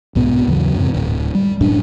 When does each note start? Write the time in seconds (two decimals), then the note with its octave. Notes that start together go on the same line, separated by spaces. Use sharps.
0.15 B1 G#2 B2 B3
0.47 D#2 C#3 E3 F#3
0.75 F2 G#2 C3
0.94 D1
1.35 G3
1.61 E1 F#2 A2 D4